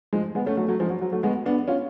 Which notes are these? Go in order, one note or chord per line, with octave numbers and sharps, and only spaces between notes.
F3 G#3
G#3 B3
A3 C#4
F#3 A3
F#3 A3
F3 G#3
F#3
F#3
F#3 A3
G#3 B3
B3 D4
C#4 F4